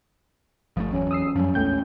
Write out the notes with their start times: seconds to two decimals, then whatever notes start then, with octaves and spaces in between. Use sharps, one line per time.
0.77 G1 F3 G3 A3
0.92 E2 E3 F#3 C#4
1.11 D#6 E6 C7
1.36 F#2 F3 G3 C#4
1.55 A#1 E2 G#3 A3 G5 G6